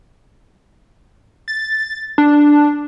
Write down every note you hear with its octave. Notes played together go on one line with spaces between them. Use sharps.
A6
D4